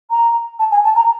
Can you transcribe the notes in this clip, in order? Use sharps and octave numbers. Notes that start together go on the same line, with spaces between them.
A#5
A5
G#5
A5
A#5